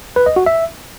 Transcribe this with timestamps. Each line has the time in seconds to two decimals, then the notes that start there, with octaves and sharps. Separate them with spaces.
0.16 B4
0.26 D#5
0.36 F#4
0.46 E5